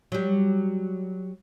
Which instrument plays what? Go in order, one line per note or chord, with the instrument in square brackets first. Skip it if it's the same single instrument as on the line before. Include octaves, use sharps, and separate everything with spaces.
[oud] F#3 G3